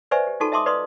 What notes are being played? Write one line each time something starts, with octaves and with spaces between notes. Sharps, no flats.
B4 C5 D5 E5 G#5 C#6
G4
D#4 F4 F#4 A4 A5 C#6
D#5 E5 A5 C6 D6 D#6
B4 D5 D#5 F5 C6 D#6